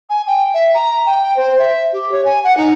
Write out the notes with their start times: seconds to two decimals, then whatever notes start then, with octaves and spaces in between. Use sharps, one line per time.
0.09 G#5
0.27 G5
0.54 E5
0.74 A#5
1.06 G5
1.36 C5
1.59 E5
1.93 G4
2.11 C#5
2.25 G#5
2.44 F#5
2.57 D#4